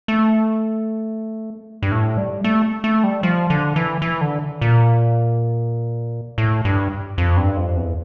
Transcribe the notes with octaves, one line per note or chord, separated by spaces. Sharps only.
A3
G2
A2
G3
A3
A3
G3
F3
D3
E3
E3
D3
A#2
A2
G2
F2
G2
F2
E2